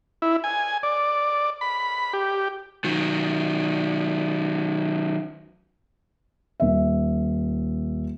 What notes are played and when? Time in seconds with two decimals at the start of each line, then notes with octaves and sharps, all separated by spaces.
0.22 E4
0.44 G#5
0.83 D5
1.61 B5
2.13 G4
2.84 D#3 F#3
6.60 D#1 E5